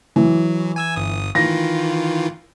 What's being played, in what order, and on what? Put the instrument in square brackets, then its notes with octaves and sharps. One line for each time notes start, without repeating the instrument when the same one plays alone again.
[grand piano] E3 [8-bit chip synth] F#3
[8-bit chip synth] G#5 E6 G#6
G1 D#6
[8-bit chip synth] D#3 E3 F4 [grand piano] A#6